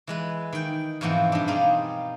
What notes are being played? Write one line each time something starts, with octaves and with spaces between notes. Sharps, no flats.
E3 G#3 B4
D#3 G5
G#2 B2 E3 F3 B3 C4
G2 D4
G3 D#4 F4 G#4 G5